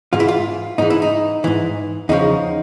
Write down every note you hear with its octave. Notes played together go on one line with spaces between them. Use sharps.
G#2 E3 F4
E4
F4
G#2 E3 D#4
E4
D#4
G#2 E3
E2 C#3 F3 D#4